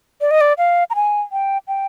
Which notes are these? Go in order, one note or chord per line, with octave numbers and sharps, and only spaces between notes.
D5
D#5
D5
F5
A#5
G#5
G5
G5